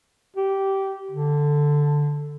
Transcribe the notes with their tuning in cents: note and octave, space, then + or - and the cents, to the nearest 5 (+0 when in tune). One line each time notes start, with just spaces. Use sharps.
G4 -15
D3 +0